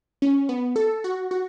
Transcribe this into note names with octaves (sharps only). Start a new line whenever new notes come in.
C#4
B3
A4
F#4
F#4